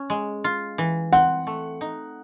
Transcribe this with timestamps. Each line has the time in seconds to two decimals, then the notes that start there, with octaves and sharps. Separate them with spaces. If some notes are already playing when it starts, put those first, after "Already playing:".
Already playing: C#4
0.10 G#3
0.44 F4
0.78 E3
1.13 C4 F#5
1.47 A3
1.81 D#4